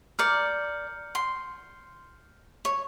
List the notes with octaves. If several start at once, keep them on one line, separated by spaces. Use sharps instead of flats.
A#4 D5 F6 G6 C#7
C6
C#5